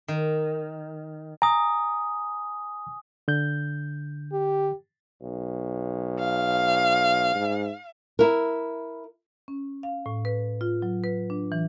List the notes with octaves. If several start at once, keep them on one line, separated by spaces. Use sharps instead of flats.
D#3
G#5 A#5 D#6
D3 G6
G4
B1
F5
G#2
E4 A#4
C#4
F5
A2
B4
F4
F#3
B4
D4
E3